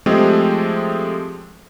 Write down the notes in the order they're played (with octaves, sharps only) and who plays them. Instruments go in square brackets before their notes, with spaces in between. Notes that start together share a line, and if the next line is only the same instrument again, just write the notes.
[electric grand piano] F3 G#3 A3 C4 G4 G#4